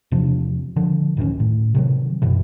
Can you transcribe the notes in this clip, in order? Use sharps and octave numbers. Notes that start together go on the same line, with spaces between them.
E2 C3 F3 D4
D3 F3
A1 D2 D#3 C#4
A2
C3 D#3 F#3
G#1 F#2 B2 E3